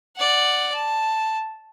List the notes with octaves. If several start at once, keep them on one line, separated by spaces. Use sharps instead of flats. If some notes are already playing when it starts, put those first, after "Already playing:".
D5 F#5
A5